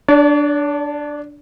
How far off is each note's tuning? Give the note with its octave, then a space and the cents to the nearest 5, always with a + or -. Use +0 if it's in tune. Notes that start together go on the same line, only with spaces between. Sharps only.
D4 +0 D5 -45